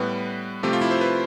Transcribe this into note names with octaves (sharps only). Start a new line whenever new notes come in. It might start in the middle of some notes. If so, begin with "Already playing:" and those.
Already playing: A2 G3 B3 B4
C3 F3 A3 C4 G4
F4
E4
C5
B4